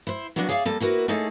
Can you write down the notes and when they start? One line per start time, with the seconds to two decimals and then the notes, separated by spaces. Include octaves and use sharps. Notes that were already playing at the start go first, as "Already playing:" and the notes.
0.07 E4 C5
0.36 F#3 G3 A#3 B3 D4 F#4
0.49 G#4 C#5 D5 E5 F5
0.65 G3 A#3 A4
0.80 A#3 E4 F#4 A#4 B4
1.08 A3 A#3 D#4 G#4 A4 C#5